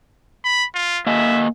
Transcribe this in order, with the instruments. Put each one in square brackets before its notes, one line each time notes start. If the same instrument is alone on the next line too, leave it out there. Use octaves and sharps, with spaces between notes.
[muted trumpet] B5
F4
[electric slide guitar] A#3 D#5 G#5 [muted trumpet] E5